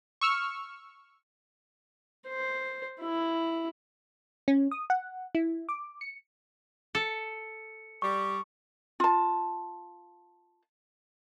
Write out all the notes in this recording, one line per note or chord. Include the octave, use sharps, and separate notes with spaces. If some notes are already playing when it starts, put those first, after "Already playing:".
C#6 E6 F6
C5
E4
C#4
D#6
F#5
E4
D6
C#7
A4 C#7
G3 C#6
F4 A5